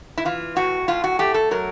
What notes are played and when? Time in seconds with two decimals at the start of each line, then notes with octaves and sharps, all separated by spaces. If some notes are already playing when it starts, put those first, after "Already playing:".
0.18 E4
0.25 E3 F4
0.56 A2 F#4
0.88 A2 F4
1.04 F#4
1.19 A3 G4
1.34 A4
1.51 F#3 A#4